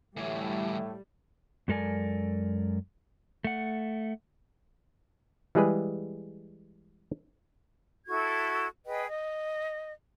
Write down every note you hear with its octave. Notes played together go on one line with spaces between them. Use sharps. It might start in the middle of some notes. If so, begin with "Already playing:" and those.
D2 A2 E3 G3 A3
F#2 G#3 A4 A#4 D5 G#5
A3 F#5
E3 G3 G#3 G#4 B4
E4 F#4 A4 G#6
G#4 B4 D#5 G5
D#5